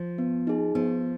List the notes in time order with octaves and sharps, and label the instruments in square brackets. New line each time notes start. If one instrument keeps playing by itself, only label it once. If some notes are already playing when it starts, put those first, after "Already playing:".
Already playing: [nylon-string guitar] F3
[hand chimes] B3
D#4 G#4
[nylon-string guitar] F3 [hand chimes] B3